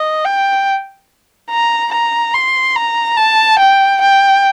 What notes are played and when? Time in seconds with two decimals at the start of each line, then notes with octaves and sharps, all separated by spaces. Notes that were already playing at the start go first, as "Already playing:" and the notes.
Already playing: D#5
0.25 G5
1.50 A#5
1.93 A#5
2.34 C6
2.76 A#5
3.17 A5
3.59 G5
4.01 G5